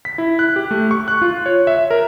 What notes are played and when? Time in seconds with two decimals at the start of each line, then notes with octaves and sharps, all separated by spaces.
0.05 B6
0.18 E4
0.39 F#6
0.56 G4
0.71 A3
0.91 C#6
1.08 F#6
1.22 F4
1.46 C#5
1.67 E5
1.91 A#4